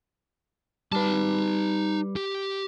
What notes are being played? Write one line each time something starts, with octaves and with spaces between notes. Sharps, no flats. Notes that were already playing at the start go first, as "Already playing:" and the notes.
G3 D#4 B4 A5
G4